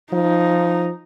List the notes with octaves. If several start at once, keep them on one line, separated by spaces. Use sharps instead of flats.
F3 D#4